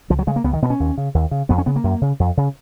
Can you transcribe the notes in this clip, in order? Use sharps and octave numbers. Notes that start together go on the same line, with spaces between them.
C#2 F3
F#3
C#3 G#3
A#3
C#2 B3
D#3
B2 B3
C#4
D#2
C#3
D#2
C#3
F2 B3
C#4
C#3 B3
A#3
F#2
C#3
F2
C#3